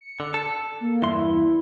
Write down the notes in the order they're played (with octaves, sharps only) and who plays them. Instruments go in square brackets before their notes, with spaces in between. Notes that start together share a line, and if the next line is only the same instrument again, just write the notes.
[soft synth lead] C#7
[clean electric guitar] D3
A4
[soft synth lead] A#3
[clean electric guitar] E2 G2 C6 [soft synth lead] E4